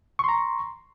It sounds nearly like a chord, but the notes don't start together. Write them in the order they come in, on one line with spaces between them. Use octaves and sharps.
C#6 C6 A#5